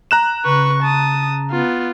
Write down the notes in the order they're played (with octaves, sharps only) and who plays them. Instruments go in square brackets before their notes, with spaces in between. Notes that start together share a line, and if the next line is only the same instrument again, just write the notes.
[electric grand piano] A#5 F#6 E7
[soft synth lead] C#3 [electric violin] B4 C#6
[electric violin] A5 D#6
B3 F4